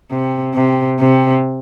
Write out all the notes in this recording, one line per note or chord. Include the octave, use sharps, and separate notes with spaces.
C3
C3
C3